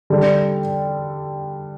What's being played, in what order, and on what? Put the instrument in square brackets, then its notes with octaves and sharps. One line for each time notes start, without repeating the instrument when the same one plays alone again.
[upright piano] D3 G3 D4 A4